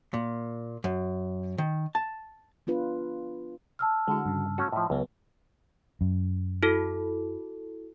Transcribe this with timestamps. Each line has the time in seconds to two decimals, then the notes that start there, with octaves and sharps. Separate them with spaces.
0.14 A#2
0.84 F#2
1.58 D#3
1.95 A5
2.67 B3 D4 F4 B4
3.79 A5 E6 F6
4.08 D3 G#3 E4 F#4
4.26 G2 C#3
4.58 A3 C#4 F#4
4.72 A2 F3 D#5 E5
4.90 C#2 F#3 B3
6.01 F#2
6.63 E4 F#4 A4